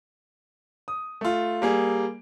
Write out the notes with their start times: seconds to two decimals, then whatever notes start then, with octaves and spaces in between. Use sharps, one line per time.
0.88 D#6
1.21 A3 F4
1.62 G3 A#3 G#4